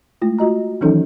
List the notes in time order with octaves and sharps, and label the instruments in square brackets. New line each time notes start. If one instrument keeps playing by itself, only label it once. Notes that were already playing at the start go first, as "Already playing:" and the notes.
[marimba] G#3 A3 E4 F4
F4 F#4 D#5 A#5
D#3 E3 F#3 C#4 D#4 A4